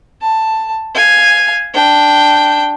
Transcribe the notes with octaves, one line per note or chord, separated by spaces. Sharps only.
A5
F5 G#5
D4 G5